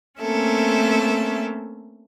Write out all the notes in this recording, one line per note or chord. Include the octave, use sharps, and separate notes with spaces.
A3 A#3 C4 C#4 A4 E5